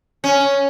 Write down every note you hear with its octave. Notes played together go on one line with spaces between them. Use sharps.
C#4